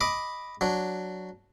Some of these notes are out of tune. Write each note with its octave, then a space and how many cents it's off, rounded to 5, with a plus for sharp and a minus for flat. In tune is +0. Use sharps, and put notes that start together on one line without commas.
D#5 +5 B5 +0 D6 +0
F#3 +0 D4 +0